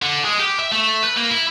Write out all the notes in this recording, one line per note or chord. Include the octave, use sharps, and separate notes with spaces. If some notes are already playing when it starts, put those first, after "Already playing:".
D3
G#3
G4
E5
A3
B4
A#3
E4